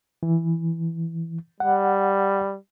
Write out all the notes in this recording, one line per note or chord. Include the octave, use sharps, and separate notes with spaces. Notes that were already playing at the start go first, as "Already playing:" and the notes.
E3
G3 F#5